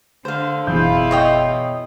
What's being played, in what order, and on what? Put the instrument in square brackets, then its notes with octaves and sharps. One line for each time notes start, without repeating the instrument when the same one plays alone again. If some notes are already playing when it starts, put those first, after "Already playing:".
[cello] D3 [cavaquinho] C5 F5
[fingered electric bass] F#1 E3 F#3 [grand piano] B2 G#4 G6 [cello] E4 F4
[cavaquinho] C#5 D#5 G5